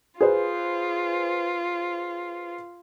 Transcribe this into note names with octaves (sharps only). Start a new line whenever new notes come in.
F4 G#4 B4 C5